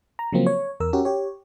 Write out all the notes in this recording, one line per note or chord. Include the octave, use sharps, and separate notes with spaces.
A#5
C#3 F3 F#3 A#3 C4
C#5
E2 A#4 E6
C#4 F#4 G4 A#4
G4 C#5